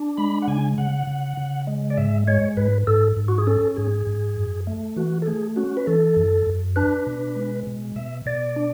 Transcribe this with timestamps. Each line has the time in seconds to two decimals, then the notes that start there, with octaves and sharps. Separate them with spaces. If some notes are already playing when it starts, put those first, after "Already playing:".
Already playing: D4
0.17 G#3 B5
0.42 F#5
0.48 C#3 G#5
0.78 C#3 F#5
1.07 C#3
1.37 C#3
1.67 G#3
1.90 D5
1.97 G#2 E5
2.28 G#3 C#5
2.57 G#2 B4
2.87 G#2 A4
3.17 G#2
3.28 F#4
3.38 G#4
3.47 C#4 A4
3.77 G#2 G#4
4.07 G#2
4.37 F#2
4.67 A3
4.96 E3 F#4
5.22 A4
5.26 A3 G#4
5.56 C#4 F#4
5.77 B4
5.87 E3 A4
6.17 F#2
6.46 F#2
6.76 D4 B4
7.07 B2
7.36 G#3
7.67 B2
7.96 B2 E5
8.26 B2 D5
8.56 D4